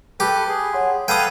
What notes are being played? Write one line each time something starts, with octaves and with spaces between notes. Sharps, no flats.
G4 A4 B4
G#4
C#5 F#5 C6
A4 B4 F5 G5 D#6 E6 G#6 D#7